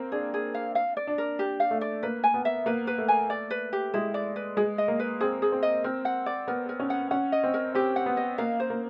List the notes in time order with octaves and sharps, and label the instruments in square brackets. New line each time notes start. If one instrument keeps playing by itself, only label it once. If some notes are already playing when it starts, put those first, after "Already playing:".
Already playing: [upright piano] A#3 C4
[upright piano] D4 [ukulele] G#4
[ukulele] G#4
F5
F5
D5
[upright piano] D4
[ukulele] A#4
G4
F5
[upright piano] A3
[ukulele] D5
[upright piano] A#3 [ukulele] B4
[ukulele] G#5
[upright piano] B3
[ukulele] E5
[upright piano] A#3 [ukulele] B4
[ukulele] B4
[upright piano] A3
[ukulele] G#5
D5
B4
G4
[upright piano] G#3 [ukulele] E4
[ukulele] D5
B4
[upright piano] G#3 [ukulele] G#4
[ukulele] D#5
[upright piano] A#3
[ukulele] B4
[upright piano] C4 [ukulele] G#4
[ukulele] G#4
[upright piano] C4
[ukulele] D#5
[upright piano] C4 [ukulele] A#4
[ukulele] F#5
D5
[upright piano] B3 [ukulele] A#4
[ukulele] A#4
[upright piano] C#4
[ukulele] F#5
[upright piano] C#4 [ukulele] F#5
[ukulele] D#5
[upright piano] C4
[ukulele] A#4
[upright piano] C4 [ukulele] G4
[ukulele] F#5
[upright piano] B3
[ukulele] D#5
[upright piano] A#3 [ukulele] F5
[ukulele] C5
[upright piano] A#3